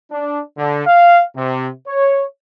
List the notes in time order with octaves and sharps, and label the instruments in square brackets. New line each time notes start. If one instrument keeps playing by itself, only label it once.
[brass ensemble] D4
D3
F5
C3
C#5